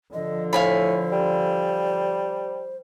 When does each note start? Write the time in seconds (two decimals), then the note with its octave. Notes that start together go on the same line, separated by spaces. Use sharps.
0.14 D3 F3 D#5
0.53 A2 C5 F5 G#5 B5
1.12 G3